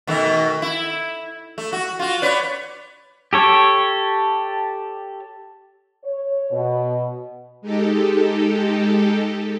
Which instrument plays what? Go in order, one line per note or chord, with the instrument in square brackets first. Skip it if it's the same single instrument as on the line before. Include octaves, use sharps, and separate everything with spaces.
[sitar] B2 D#3 A3
E4
A3
F#4
F4 F#4
B4 C#5 D5
[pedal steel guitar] G4 A4 C#5
[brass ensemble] C#5
B2
[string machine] G#3 D#4 G4 A4